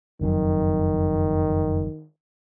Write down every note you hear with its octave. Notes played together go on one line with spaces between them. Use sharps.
F#1 F2 D#3 F#3